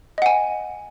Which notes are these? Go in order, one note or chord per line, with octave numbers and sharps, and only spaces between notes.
D#5 F#5 G#5